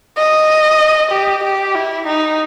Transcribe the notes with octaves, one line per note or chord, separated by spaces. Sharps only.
D#5
G4
G4
E4
D#4